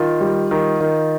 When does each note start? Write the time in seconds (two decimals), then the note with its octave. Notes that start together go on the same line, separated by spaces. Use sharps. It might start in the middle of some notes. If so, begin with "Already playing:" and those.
Already playing: D#3 F4
0.21 G3
0.51 D#3
0.81 D#3